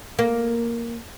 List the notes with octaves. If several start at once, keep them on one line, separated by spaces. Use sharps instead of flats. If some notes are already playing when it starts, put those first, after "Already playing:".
A#3